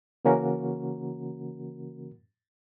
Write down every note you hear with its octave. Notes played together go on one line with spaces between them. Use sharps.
C#3 E3 A#3 C#4 F#4 A#4